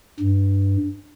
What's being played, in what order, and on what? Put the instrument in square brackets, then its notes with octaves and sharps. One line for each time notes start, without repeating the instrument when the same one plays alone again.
[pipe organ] G2